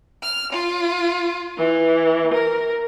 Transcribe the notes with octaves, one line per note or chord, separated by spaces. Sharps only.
F6
F4
E3
A#4